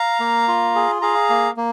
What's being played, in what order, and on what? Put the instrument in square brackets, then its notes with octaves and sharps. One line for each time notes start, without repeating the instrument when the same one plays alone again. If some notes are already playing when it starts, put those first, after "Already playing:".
Already playing: [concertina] F5 A#5
A#3
F4
G#4
G#4 F5 A#5
A#3
A#3